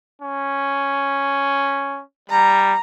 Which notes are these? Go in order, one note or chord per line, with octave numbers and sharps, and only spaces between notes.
C#4
G3 A#5